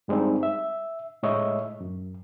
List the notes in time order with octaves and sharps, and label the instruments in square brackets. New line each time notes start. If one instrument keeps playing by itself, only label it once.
[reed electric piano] G2 G3 G#3 C4 D#4
E5
A2 G#3 C#5 D#5 E5
F#2